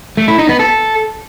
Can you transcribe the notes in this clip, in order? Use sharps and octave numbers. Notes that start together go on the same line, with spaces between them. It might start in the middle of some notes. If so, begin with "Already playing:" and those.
A3
E4
D#4
B3
A4